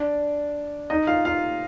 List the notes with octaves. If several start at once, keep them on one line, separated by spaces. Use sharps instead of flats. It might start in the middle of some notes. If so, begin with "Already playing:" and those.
Already playing: D4 D5
D#4 D#5
F4 F5
F4 F5